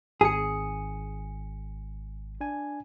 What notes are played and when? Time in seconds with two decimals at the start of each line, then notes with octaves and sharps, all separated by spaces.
0.21 G#1 G#4 C#7
2.41 D4 G#5